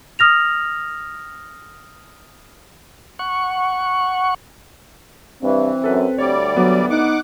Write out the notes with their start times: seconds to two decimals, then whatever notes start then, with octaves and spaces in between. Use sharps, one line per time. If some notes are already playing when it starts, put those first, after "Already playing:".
0.19 D#6 F6 A#6 F7
3.19 F#5 C#6
5.42 G2 E3 C4
5.84 F#2 A4 B4
6.18 D2 G3 C#5 D5
6.56 F#3 B3
6.90 D#4 F#5 D6